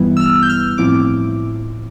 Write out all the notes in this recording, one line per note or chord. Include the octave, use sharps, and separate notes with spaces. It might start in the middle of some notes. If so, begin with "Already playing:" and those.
Already playing: G2 E3 G3 B3 E4
E6
F6
G6
F6
A2 F3 C4 E4 D6